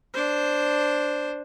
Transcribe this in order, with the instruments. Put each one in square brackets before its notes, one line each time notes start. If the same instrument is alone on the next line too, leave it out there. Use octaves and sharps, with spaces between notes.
[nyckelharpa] D4 C5